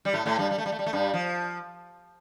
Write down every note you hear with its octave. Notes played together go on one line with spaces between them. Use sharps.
G3
A2 A3
A2 A3
G2 G3
G3
A3
G3
A3
G3
A3
G2 G3
F3